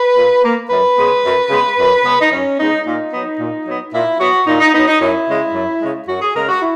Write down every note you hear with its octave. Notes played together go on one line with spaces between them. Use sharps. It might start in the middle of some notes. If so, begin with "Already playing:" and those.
Already playing: B4
A#2
A#3
F#2 B4
C#3 G#3 B3
F#2
C#3 G#3 B3
F#2
C#3 G#3 B3
D#4
F#2 C#4
C#3 G#3 B3 D#4
A#2 D#4
F#3 B3
A#2
F#3 B3
A#2 E4
F#3 B3 F#4
A#2 D#4
D#4
F#3 B3 D#4
D#4
F#2 E4
C#3 G#3
F#2
C#3 G#3
F#2 F#4
G#4
C#3 G#3 A#4
F#4
E4